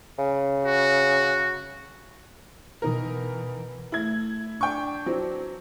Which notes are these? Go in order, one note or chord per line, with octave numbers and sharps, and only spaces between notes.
C#3
F#4
B2 E3 D#4 A#4
A3 E4 G#6
D4 G5 C#6
E3 F#3 C4